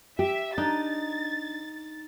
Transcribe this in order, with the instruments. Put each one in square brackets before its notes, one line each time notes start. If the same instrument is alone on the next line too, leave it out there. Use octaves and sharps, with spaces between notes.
[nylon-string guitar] G4 [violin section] E5
[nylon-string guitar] D4 [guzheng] D#4 [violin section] A6